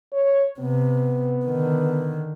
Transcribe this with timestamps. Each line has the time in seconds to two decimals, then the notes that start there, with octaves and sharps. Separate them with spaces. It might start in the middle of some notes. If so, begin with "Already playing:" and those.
0.12 C#5
0.59 C3 B3
1.46 D3 D#3